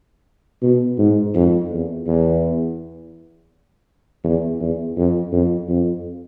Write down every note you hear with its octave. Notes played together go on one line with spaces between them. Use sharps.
B2
G#2
F2
E2
E2
E2
E2
F2
F2
F2